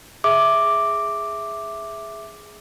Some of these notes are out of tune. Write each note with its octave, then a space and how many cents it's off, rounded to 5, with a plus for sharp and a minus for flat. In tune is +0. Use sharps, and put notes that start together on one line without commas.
G#4 +0 E5 +0 D6 +0